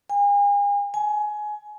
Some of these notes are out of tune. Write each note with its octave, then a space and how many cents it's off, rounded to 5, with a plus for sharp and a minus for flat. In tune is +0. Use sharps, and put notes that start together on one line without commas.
G#5 -40
G#5 +20